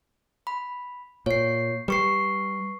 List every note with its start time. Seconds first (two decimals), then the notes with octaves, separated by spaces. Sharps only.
0.47 B5
1.26 A#2 C#5 C7
1.88 G3 B4 C#6 C7